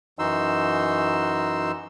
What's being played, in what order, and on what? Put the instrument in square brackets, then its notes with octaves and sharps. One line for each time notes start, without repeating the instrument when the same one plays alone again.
[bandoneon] F#2 E3 D#4 F#4 C6 E6